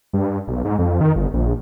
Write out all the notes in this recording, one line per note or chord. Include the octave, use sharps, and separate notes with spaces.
G2
B1
G#2
F2
D#3
G1
A#1